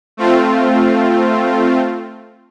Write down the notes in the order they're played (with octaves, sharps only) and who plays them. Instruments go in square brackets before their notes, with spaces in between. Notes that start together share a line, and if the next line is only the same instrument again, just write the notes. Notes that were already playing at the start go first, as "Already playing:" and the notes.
[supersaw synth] A3 C4 F4